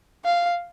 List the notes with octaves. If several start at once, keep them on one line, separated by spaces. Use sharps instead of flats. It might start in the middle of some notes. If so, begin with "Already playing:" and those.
F5